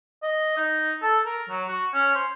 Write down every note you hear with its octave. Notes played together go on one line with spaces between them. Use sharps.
D#5
D#4
A4
A#4
F#3
F#4
C#4
C5